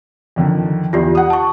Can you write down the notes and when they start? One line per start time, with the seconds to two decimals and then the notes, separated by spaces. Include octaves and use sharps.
0.36 F2 D3 D#3
0.93 E2 F4 G4 D5
1.15 F#5 D#6
1.30 A5 C#6